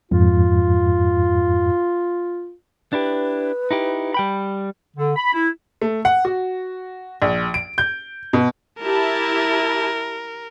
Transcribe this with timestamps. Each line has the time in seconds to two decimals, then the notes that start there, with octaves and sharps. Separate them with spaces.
0.11 F2 G#2 F4
2.93 D4 E4 G4 B4
3.71 D#4 E4 G4
4.14 G3 G5 B5
4.97 D3
5.16 B5
5.33 E4
5.81 A3
6.05 F#5
6.25 F#4
7.22 A#1
7.54 D7
7.78 G6
8.33 B2
8.80 E4 G4 A#4 A5